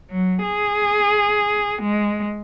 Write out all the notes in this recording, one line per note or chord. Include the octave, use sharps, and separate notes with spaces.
F#3
G#4
G#3